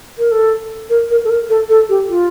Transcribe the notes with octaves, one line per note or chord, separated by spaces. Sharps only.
A#4
A4
A#4
A#4
A4
A#4
A4
A4
G4
F4